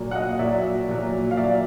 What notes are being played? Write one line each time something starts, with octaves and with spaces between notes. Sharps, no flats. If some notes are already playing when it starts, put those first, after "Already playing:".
Already playing: A#2 F#3
F#5
D#5 F5
A#2 F#3 D5 E5
A#2 F#3
F5
A#2 F#3 D5 E5